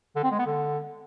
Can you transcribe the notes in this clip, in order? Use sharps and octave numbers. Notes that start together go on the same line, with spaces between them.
D3
C4
G#3
B3
D3